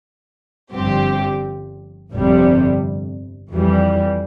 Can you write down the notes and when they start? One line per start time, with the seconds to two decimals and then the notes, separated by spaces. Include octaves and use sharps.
0.72 G1 G2 F3 C4 G4
2.10 G1 F2 C3 G3
3.49 F2 E3 G3